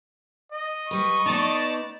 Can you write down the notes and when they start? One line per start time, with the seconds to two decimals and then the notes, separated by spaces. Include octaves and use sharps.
0.52 D#5
0.91 G3 B4 C#6
1.26 B3 D#4 D5 A5